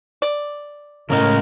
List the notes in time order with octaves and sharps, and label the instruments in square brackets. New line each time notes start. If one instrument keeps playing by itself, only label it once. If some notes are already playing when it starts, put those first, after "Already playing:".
[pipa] D5
[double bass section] A2 [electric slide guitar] C#3 C#4 D#5 [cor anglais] A#4